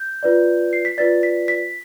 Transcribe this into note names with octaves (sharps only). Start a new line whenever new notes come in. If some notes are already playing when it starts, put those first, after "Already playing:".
Already playing: G6
F4 B4 D5
C7
B6
F4 B4 D5 A6
B6
B6